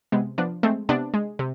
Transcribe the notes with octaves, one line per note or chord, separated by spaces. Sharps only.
C3 G#3 B3
F3 B3 D4
G#3 A3 C4
C3 B3 D4
G#3
C3